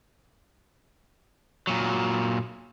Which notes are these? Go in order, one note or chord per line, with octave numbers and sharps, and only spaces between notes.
A#2 F#3